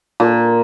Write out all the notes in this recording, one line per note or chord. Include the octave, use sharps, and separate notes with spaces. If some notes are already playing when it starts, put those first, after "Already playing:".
A#2